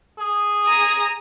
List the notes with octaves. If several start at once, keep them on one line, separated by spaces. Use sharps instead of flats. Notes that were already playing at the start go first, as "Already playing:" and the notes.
G#4
A#5 D#6